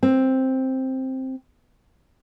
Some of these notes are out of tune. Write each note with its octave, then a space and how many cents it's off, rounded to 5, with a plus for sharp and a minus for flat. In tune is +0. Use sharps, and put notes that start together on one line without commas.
C4 +5